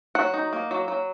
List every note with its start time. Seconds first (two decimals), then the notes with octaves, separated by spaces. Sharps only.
0.15 F#3 F#5
0.34 D#4
0.53 A#3
0.71 F#3
0.88 F#3